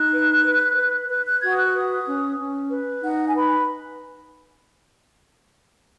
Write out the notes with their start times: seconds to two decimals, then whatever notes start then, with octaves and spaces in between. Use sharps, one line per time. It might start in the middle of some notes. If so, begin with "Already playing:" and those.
Already playing: D#4 F#6
0.13 B4
0.46 B4
0.77 B4
1.09 B4 F#6
1.26 F#6
1.41 F#4 G#6
1.50 D#6
1.57 F#6
1.74 B4 D#6
2.06 C#4
2.38 C#4
2.70 B4
3.02 D#4 F#5
3.27 G#5
3.34 B4 B5